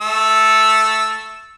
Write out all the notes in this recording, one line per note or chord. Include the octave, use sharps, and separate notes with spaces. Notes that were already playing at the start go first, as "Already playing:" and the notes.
A3 E6